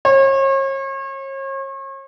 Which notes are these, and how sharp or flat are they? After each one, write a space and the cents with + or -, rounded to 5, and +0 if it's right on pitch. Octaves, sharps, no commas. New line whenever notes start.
C#5 -40